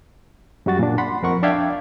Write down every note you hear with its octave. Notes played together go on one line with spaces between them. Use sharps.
F#2 G3 F#4 A6
A#2 D4
F#5 B5 C6
F2 A#4 F#5 C#6
D4 D5 E5 F5 G5 G#6